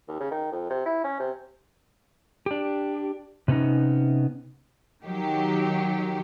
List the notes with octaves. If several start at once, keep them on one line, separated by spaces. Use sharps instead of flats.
D#2
C#3
D#3
F2
C3
E4
C#4
C3
D4 G4
C3 B3 C#4 D#4
D#3 F#3 G4